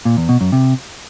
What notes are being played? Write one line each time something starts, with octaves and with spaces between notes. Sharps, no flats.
A#2
E2
B2
F#2
C3